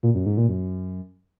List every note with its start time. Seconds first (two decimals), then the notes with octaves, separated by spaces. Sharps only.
0.03 A#2
0.14 F#2
0.26 G#2
0.37 A#2
0.48 F#2